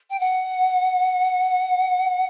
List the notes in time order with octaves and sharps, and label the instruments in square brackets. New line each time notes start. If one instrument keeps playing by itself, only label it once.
[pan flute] G5
F#5